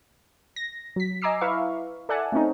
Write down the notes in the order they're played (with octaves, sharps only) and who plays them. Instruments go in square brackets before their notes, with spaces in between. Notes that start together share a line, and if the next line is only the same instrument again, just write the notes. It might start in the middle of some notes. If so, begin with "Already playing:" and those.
[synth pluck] A#6
F#3 B6
D#5 G#5 A#5 D6 E6 C7
E4 B4 E5 F5 C#6
A4 D5 E5 F#5 G#5 A5
A3 C4 C#4 D#4